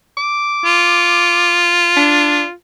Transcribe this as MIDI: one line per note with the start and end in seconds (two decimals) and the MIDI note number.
0.18 1.59 86
0.65 2.52 65
1.97 2.43 62